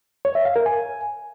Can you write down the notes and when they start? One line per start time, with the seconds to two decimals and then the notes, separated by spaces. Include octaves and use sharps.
0.25 C#5
0.35 E5
0.45 F5
0.56 A#4
0.66 G#5